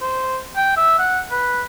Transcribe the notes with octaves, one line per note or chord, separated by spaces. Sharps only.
C5
G5
E5
F#5
B4